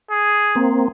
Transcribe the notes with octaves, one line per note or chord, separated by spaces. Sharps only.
G#4
A#3 C4